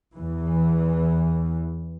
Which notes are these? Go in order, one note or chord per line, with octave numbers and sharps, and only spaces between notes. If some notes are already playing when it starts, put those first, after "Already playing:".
E2 E3